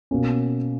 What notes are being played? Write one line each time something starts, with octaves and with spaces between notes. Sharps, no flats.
B2 A#3 C#4